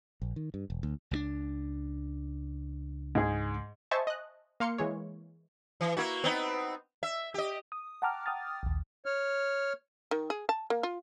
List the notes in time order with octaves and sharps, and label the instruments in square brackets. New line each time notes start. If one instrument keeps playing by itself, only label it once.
[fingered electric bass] A#1
D#3
G2
E1
D2
[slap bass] C#2 F#3 D4
[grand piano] G#2 G#4
[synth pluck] C5 D#5 E5 G#5 A5 C#6
D#5 F#6
A#3 F5 C6 C#7
E3 G#3 C#5
[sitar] E3
A#3 E4 F#4
B3 C4 D#4
E5
G4 D#5
[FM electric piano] D#6
F#5 G5 A5 A#5 D6 F6
G5 D6 D#6 F6 A6
A#1 D#2
[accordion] C#5 F6
[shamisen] D#3
G#4
A5
A#3
F4